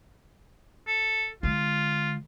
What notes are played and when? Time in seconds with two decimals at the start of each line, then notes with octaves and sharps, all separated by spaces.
0.87 A4
1.43 D3 G#3 F4